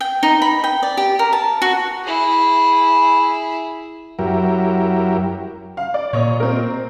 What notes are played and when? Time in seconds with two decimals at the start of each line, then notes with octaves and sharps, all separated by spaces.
0.01 G5
0.23 D#4
0.42 B5
0.64 G5
0.83 D5
0.97 G4
1.19 A#4
1.33 A5
1.62 F#4
2.04 E4 G#4
4.19 F#2 F#3 E4 G4 A#4
5.77 F5
5.94 D5
6.13 A#2 C#5 D#5
6.40 C4 A#4